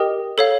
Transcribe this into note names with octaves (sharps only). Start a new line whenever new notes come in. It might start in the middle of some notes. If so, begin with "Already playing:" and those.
Already playing: G4 A#4 D#5 G5 D#6
A4 C#5 F5